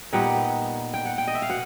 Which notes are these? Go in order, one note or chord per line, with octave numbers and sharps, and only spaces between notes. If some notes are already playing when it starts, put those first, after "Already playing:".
A#2 G3 B3 D#4 F#5
G5
F#5
G5
D#5
E5
F5
B2 F#5